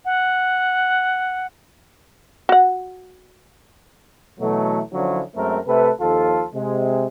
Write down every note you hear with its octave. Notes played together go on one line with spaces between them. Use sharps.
F#5
F#4 F#5
B2 E3 F#3 A3
D3 F3 F#3 C#4 D4 E4
F#2 G#3 A3 C4 A#4
C3 A3 A4 B4
D#2 F3 F4 A4
C3 G#3